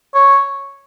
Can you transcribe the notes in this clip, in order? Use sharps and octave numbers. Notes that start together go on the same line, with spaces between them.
C#5